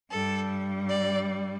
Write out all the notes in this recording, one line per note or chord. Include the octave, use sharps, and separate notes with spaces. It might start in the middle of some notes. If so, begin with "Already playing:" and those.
G2 G3 A4
D5